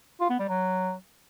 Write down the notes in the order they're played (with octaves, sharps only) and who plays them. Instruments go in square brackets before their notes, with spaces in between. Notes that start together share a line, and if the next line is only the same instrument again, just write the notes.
[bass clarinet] F4
B3
G3
F#3